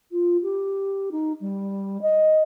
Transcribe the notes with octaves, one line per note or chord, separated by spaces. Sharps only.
F4
G4
D#4
G3
D#5